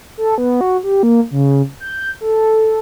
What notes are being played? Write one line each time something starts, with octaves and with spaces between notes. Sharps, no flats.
A4
B3
F#4
G4
A#3
C#3
G6
A4